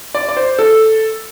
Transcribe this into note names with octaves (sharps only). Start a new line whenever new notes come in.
D5
D5
C5
A4